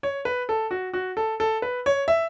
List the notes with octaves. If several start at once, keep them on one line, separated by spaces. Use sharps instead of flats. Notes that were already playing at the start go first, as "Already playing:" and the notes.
C#5
B4
A4
F#4
F#4
A4
A4
B4
C#5
E5